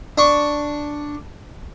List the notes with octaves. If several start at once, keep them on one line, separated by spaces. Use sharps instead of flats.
D4 C#6